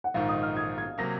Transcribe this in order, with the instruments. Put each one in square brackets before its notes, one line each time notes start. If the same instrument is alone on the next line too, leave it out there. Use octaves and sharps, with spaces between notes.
[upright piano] F#5
[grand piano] A#1 G#2 D#3 [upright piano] F5
[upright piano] D#6
F6
G#6
G#6
[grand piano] C3 F#3 A#3 [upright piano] A#6